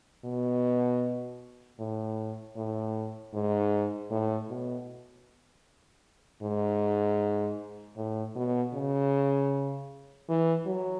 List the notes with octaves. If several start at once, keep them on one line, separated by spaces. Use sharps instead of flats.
B2
A2
A2
G#2
A2
B2
G#2
A2
B2
C#3
E3
F#3